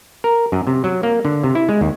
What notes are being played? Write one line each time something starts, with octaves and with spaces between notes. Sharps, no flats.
A#4
F#2
C3
F#3
A#3
D3
C3
E4
G#3
D#2